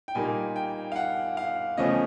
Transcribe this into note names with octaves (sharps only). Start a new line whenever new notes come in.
G5
A#2 G3 A#3 D#4 G#5
G5
F5
F#5
F5
E2 C#3 F3 A3 C#4 D#5